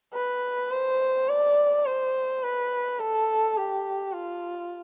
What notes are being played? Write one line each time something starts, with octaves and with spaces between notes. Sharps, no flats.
B4
C5
D5
C5
B4
A4
G4
F4